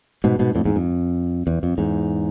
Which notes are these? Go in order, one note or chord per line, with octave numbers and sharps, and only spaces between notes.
G#2 B2
G#2 B2
F2 A2
E2 G#2
F2
E2
F2
E2 G#2